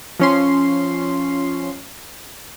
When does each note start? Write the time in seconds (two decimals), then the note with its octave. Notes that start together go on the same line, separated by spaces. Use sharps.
0.19 F3 C#4 C6